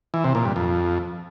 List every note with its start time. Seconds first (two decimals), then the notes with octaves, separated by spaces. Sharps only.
0.14 E3
0.24 C3
0.35 A#2
0.45 G2
0.56 F2